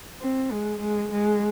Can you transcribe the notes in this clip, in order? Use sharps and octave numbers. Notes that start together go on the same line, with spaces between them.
C4
G#3
G#3
G#3